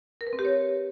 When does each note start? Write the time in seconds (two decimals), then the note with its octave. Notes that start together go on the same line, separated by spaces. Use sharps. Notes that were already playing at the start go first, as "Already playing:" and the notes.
0.21 A#4
0.27 B4
0.33 C4
0.39 G4
0.45 C#5